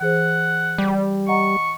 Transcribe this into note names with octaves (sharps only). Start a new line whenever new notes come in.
E3 G#4 C5 F#5
G3
D#5 F#5 A#5 C#6